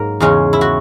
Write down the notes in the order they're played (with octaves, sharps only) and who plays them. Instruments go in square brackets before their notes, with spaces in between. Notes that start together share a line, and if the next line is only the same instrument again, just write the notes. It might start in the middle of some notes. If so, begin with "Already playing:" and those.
Already playing: [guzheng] G#2 F#3 A#3 A#4
E2 C#3 G#3 C#4
E4
F#4